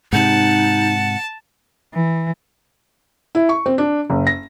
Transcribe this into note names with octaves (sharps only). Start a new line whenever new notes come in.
G#2 C3 D#4 F#5 A5
E3
E4
C#6
C4
D4
F#1
A#6